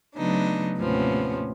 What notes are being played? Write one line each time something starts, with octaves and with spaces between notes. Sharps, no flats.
C#3 F#3 A3 B3 D4 D#4
D#2 A2 C3 F3 B3 C#4